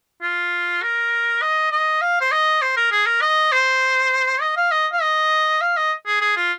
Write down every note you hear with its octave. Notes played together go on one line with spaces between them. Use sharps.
F4
A#4
D#5
D#5
F5
C5
D#5
C5
A#4
G#4
A#4
D#5
C5
D#5
F5
D#5
F5
D#5
F5
D#5
G#4
G#4
F4